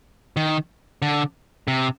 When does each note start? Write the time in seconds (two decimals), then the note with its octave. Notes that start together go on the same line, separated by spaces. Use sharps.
0.37 D#3
1.02 D3
1.68 C3